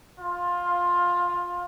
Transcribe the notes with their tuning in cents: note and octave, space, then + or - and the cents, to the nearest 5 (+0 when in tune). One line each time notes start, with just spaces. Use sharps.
F4 +15